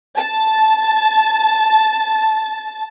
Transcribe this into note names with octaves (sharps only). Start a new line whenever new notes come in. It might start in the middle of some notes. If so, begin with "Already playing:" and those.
A5 A6